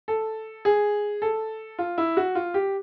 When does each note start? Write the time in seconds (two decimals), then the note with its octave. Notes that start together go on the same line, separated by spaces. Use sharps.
0.08 A4
0.65 G#4
1.22 A4
1.79 F4
1.98 E4
2.17 F#4
2.35 F4
2.54 G4